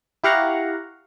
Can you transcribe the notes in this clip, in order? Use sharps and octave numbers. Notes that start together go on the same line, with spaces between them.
E4 G4 F5 F#5 A#5 C#6